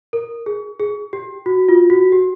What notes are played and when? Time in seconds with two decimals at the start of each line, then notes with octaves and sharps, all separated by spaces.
0.13 A#4
0.46 G#4
0.80 G#4
1.13 G4
1.46 F#4
1.69 F4
1.90 F#4
2.12 G4